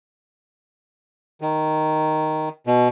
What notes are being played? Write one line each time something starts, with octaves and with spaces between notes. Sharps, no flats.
D#3
B2